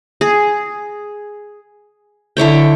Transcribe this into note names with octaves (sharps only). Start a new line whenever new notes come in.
G#4
D3 E4 C#5 G5